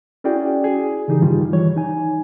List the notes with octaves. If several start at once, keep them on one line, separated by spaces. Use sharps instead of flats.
C#4 E4 F#4 G#4 D5 G5
G#4
C#3 E3 D#4 G4 G#4
G2 D#3 G3 F4
E3 G3 C#5
D#4 G#5